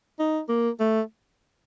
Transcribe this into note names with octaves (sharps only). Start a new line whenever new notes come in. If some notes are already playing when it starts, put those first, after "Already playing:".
D#4
A#3
A3